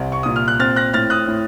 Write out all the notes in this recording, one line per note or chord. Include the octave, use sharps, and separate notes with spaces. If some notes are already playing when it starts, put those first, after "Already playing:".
Already playing: C2 C4
C#6
A#2 D#6
F6
F#6
C4 F6 A6
F#6 A#6
A2 F6 A6
D#6 F#6
A2